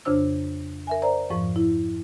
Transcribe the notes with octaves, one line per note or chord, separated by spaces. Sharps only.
F2 C#3 D4 C5 E6
A#4 E5 G#5
C5 D5 A#5
F2 G#2 F3 C#6
E4